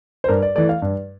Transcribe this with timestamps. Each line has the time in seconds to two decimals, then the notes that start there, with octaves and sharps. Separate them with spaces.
0.24 C5
0.28 G2 A#4
0.42 D5
0.55 E3 A3 D5
0.69 F5
0.82 G2